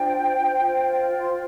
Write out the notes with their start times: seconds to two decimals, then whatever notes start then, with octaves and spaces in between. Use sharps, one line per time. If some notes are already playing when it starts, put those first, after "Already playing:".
Already playing: D4 F4 C5 G5
0.57 F4 C5
1.20 C6